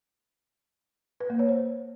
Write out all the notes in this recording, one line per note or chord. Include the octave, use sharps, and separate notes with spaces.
B4
A#3
C#5
C5